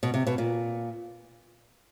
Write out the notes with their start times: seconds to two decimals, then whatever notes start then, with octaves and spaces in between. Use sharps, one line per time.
0.03 B2
0.14 C3
0.27 B2
0.38 A#2